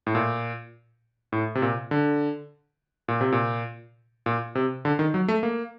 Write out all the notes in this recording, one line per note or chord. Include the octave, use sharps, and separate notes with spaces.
A2
A#2
A2
C3
A#2
D3
A#2
C3
A#2
A#2
C3
D3
D#3
F#3
A3
A#3